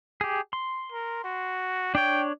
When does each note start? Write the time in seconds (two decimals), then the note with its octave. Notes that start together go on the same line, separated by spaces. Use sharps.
0.21 G4 G#4
0.53 C6
0.92 A#4
1.24 F#4
1.95 D4 C#5 G5